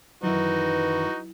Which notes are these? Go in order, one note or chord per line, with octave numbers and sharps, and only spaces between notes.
F#2 D#3 E3 F#3 D#4 E4 F#4 B4